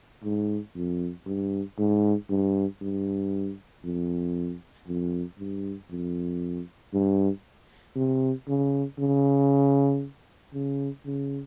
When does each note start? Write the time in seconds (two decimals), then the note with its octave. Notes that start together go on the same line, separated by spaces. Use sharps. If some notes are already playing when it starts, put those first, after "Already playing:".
0.23 G#2
0.75 F2
1.26 G2
1.78 G#2
2.30 G2
2.81 G2
3.84 F2
4.87 F2
5.38 G2
5.90 F2
6.93 G2
7.96 C3
8.48 C#3
8.99 C#3
10.53 C#3
11.05 C#3